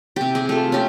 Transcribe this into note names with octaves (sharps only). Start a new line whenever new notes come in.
C3 G4
G#4
A3 F4
C#4 G4